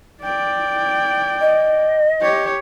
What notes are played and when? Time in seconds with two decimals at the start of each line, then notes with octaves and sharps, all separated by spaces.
0.22 D5 G5
1.40 D#5
2.21 G4 C#5